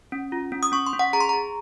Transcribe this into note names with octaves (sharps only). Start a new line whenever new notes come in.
C#4
F4
C#4
D#6
C#4 C#6
C6
C#4
F#5
G#4 A#5
C6
G#4 A#5